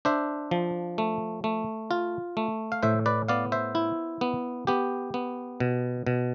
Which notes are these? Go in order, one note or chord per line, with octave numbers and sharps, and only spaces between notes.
D4 C5 E5
F3
A3
A3
F4
A3
F5
A2 C5 E5
B4 D5
B3 D5 F5
C5 E5
E4
B3
B3 G4
B3
B2
B2